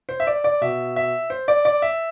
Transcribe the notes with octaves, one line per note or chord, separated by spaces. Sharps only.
C5
E5
D5
D5
B2 E5
E5
C5
D5
D5
E5